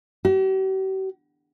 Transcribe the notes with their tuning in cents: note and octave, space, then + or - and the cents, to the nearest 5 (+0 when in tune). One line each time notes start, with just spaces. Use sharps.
G4 -45